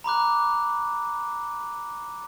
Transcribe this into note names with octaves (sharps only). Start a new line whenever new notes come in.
A#5 B5 D6 F#6